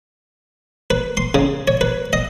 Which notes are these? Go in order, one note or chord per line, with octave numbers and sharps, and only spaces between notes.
B4
C6
C#3
C#5
B4
D#5